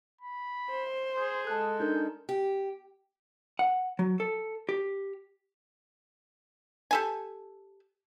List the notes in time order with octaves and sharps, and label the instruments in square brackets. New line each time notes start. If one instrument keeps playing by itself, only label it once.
[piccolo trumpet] B5
[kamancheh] C5
[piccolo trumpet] G#4 [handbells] G6
[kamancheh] G#3 A4 [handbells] A5 F#6
[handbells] D4 D#4 A#4 [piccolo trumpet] G6
[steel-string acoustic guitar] G4
[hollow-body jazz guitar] F#5
F#3
A4
G4
[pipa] G4 A4 G#5